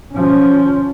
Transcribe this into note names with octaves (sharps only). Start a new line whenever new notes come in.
F3 C#4